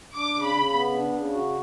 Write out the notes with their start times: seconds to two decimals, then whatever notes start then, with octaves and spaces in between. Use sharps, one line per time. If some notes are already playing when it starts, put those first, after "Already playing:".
0.15 D4 D6
0.35 C#3
0.45 B5
0.55 C#3
0.73 B3
0.93 D4
1.12 C#3
1.32 F#4